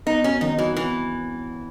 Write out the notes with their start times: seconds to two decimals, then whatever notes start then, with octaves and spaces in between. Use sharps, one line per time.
0.06 B3 D#4
0.24 F#2 C#4
0.41 D#3 D#4
0.58 E3 F#3
0.76 E3 B3